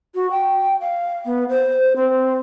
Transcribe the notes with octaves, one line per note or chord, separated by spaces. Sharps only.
F#4
G5
F5
B3
C5
C4